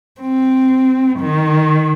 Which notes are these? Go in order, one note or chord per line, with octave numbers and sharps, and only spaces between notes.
C4
D#3